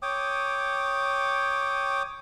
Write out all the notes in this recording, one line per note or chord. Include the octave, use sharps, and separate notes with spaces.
C#5 G5 D6 D#6